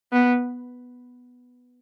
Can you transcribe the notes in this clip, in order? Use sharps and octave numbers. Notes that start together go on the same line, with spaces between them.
B3